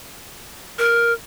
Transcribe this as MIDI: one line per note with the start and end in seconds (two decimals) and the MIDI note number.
0.79 1.12 70